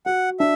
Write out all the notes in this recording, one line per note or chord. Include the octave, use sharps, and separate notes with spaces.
F#4 F#5
D4 E5